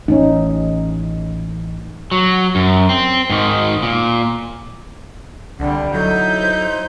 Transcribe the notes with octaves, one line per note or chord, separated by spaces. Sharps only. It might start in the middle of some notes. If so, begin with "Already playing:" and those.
A1 C#4 D#4
F#3
F#2
C4
G#2 D#3
A#2
C2 D3 G3 F#5
F#3 D#4 E4 A4 G6
C5